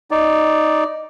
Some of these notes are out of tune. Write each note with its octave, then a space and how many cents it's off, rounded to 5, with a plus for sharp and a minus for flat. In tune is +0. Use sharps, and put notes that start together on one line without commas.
D#4 +0 D5 +0